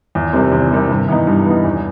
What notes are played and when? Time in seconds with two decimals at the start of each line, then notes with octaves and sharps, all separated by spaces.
0.15 E2
0.33 C3 D#3 G3 C4
0.52 E2
0.71 C3 D#3 G3 C4
0.89 G2
1.08 E3 B3 D#4
1.27 G2
1.47 E3 B3 D#4
1.64 E2